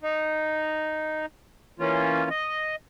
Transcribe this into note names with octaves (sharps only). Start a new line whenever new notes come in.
D#4
E3 A#3 C#4 F4
D#5